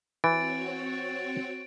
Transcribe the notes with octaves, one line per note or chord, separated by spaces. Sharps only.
E3 C4 F#4 C#5 A6 D7